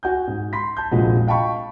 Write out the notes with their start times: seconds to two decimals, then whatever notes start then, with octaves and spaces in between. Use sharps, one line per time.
0.03 F#4 G#5 G6
0.27 G#2
0.53 B5 C6 B6
0.77 A5 G6
0.91 F1 A#1 A#2 G#3 F#4
1.27 D#5 F5 G5 A5 B5 C#6